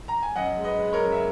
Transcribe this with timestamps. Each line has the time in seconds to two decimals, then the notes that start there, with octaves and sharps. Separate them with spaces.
0.08 A#5
0.23 G#5
0.36 F#2 D#5 F#5
0.57 G#3
0.64 B4 D#5
0.79 G#3
0.93 A#4 C#5
1.01 F#2
1.12 E5